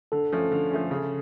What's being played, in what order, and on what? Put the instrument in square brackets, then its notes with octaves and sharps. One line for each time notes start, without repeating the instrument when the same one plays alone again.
[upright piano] D3 [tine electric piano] A4
[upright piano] F3 A3 C#4
D3
F3 A3 C#4
C#3